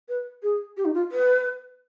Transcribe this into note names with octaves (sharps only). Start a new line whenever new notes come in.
B4
G#4
G4
D#4
F4
B4